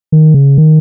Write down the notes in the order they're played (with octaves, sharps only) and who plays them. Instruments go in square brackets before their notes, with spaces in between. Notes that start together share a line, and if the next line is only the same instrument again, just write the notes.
[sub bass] D#3
C#3
D#3